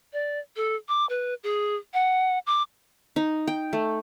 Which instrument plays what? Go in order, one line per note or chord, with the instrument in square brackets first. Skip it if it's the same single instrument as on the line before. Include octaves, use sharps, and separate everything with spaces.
[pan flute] D5
A4
D6
B4
G#4
F#5
D6
[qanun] D#4
G5
A3